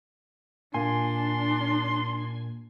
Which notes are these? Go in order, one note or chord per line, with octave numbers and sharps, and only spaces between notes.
A#2 A#3 D4 G#5 C6